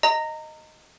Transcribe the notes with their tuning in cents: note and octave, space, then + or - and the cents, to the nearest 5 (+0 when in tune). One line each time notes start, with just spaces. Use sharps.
D#5 +0 A#5 -25